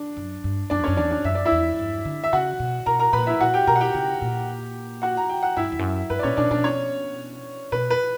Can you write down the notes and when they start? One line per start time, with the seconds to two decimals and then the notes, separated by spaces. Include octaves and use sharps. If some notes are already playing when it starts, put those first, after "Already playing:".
Already playing: D4
0.17 F#2
0.44 G2
0.70 F#2 D4 D5
0.80 E2
0.84 F#2 C#4 C#5
0.97 E2 D4 D5
1.11 D4 D5
1.24 F#2 E5
1.35 D5
1.45 E4 E5
1.52 E2
1.79 G2
2.05 D3
2.24 E5
2.33 C#3 F#4 F#5
2.60 B2
2.86 B2 A#4 A#5
2.99 A#4 A#5
3.13 A#2 B4 B5
3.27 E4 E5
3.40 A#2 F#4 F#5
3.54 G4 G5
3.67 B2 A#4 A#5
3.76 F#5
3.81 G4 G5
3.94 C#3
4.22 A#2
5.02 F#4 F#5
5.17 A#5
5.29 G5
5.43 F#5
5.57 G2 E4 E5
5.64 F#2
5.72 E2
5.79 F#2
6.10 G2 B4
6.19 D5
6.23 A#2 C#4 C#5
6.37 B2 D4 D5
6.51 B2 D4 D5
6.64 C#4 C#5
7.72 B2 B4
7.90 B4